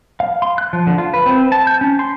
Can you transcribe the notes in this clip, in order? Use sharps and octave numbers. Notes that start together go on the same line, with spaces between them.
F5
C6
F#6
F3
D3
F4
B4
C4
A5
G6
C#4
C6